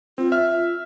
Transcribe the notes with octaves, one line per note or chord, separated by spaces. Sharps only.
C4 F4
E5 F6